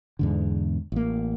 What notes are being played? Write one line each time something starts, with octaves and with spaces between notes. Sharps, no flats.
E2 G#2 D3
A1 A#3